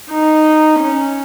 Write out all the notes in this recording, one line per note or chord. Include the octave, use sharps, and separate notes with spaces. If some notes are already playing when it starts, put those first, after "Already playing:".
D#4
C#4